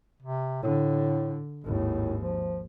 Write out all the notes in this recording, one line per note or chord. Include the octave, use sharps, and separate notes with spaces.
C3
A2 D3
G#1 D#2 A2
F3